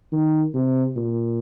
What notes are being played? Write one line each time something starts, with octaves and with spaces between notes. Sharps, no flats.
D#3
C3
A#2